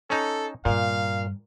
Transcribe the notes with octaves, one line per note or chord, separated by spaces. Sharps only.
C#4 D#4 A4
G2 A#2 D#3 F5